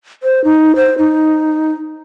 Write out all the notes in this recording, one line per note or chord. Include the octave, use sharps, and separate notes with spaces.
C5
D#4
C5
D#4